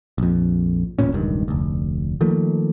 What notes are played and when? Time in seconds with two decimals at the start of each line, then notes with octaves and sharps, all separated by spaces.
0.18 A#1 F2
0.99 D1 A1 A#2 C#4
1.14 E1 C#2 G2 D#3
1.48 F1 D2
2.21 D#3 F3 A3 A#3